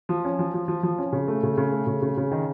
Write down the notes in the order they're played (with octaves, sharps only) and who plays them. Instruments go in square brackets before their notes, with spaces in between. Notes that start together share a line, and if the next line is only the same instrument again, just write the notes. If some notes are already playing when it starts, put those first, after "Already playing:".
[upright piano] F3
C#4
F3
F3
F3
F3
C#4
C#3
A3
C#3
C#3
A3
C#3
C#3
C#3
D#3